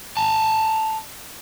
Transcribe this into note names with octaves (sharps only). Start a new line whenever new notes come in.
A5 A#5